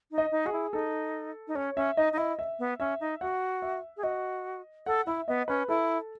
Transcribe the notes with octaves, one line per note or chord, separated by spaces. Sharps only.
D#4
D#5
D#4
F#4 G#4
E4
D#4 A4
D#4
C#4 C#5
C#4 E5
D#4 D#5
D#4
E4 D#5
E5
B3
C#4 E5
D#4
F#4 F#5
E5
G#4
F#4 D#5
A4 F#5
E4 E5
B3 D#5
C#4 B4
E4 A4